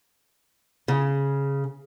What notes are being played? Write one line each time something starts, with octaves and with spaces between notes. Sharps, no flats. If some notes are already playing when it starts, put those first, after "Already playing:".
C#3